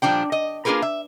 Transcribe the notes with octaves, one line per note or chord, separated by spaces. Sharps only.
A#2 F3 G3 D4 G5
D#5
A#3 D4 F4 G#4 A#4 B4
E5